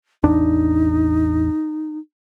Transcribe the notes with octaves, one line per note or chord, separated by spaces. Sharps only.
A1 E2 D4 D#4